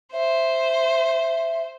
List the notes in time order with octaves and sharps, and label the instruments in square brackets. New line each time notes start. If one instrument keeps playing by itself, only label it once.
[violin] C5 [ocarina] E5